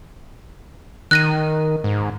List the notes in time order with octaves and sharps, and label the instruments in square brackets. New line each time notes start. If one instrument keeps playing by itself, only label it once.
[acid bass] D#3 [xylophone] F#6 A#6 D#7
[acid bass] G#2